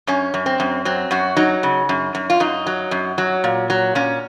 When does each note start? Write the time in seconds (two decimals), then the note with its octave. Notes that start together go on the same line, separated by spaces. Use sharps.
0.07 F#2 C#4
0.34 F#2
0.46 C4
0.60 F#2
0.85 F#3 C4
1.11 F#2 F#4
1.37 F#3 D#4
1.63 C#3
1.89 F#2
2.15 F#2
2.30 F4
2.40 F#2 D#4
2.67 F#3
2.91 F#2
3.18 F#3
3.44 A#2
3.70 F#3
3.95 A#2 C#4